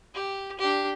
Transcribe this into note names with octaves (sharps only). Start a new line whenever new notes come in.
G4
D4 G4